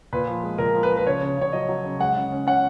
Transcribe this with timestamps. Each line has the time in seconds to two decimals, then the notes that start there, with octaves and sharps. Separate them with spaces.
0.13 A#2 B4
0.28 F3
0.43 G#3
0.58 A#2 A#4
0.75 F3
0.83 B4
0.90 F3
0.97 B4
1.06 C#3 C#5
1.22 C#3
1.37 C#3 C#5
1.52 F#3 D#5
1.68 F#3
1.84 C#3
1.99 G#3 F#5
2.16 C#3
2.32 C#4
2.47 C#4 F#5